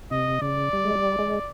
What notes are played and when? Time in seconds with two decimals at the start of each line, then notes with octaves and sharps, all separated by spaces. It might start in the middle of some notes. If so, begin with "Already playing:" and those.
0.11 C3 D#5
0.41 C#3 D5
0.73 G3
0.84 G#3
0.95 G3
1.19 G#3